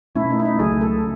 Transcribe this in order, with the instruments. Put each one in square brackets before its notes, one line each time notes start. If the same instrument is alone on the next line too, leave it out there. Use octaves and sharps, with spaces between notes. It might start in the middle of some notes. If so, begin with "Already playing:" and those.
[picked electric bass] B2 A3 C#4 [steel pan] E4
[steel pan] D#4
E4
D#4
[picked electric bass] C#2 C#3 F#3 A3 [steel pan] G#4
[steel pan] A4